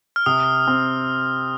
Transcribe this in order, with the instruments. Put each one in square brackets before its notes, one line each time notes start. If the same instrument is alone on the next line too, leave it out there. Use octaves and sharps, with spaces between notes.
[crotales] F6
[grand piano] C3 [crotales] D#6
[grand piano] C4